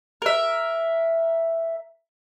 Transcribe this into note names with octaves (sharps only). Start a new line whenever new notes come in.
A#4 E5